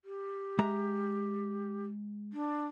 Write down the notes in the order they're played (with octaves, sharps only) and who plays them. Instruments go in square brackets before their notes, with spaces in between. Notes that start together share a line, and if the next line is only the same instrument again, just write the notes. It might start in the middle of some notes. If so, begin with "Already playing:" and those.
[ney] G4
[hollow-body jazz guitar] G#3 E5 A#5
[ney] D4